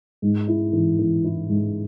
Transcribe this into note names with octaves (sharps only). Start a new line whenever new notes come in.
G#2
E4
E3
E3
E4
G#2